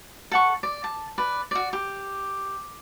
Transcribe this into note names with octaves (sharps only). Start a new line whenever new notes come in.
A4 F#5 C#6
D5
A5
B4 D5
F#4 D5
G4